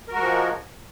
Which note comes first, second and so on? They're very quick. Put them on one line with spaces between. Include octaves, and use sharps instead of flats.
A#4 F#4 G#3 F3